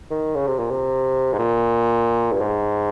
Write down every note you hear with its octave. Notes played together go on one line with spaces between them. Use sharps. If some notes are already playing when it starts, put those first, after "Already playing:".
D#3
C#3
C3
A#2
C3
G#2
A#2
G2
G#2